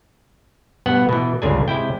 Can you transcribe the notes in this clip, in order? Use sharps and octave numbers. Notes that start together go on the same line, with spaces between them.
G2 B2 B3 F#5
B2 E3
G1 C#2 C#3 D4 G#5
C3 G#3 E4 G5